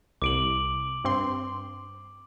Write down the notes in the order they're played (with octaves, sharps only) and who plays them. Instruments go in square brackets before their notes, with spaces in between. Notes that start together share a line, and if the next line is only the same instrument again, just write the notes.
[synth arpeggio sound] C2 [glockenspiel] D6 D7 F#7
[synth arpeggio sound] G2 C4 C6